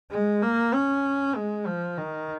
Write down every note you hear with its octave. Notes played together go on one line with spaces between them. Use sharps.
G#3
A#3
C#4
G#3
F3
D#3